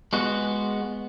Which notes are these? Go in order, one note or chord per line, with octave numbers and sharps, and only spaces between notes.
G#3 B3 F#4